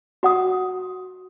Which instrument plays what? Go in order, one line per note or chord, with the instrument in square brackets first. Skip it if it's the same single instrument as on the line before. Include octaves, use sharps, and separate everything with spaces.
[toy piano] F#4 F#5 D#6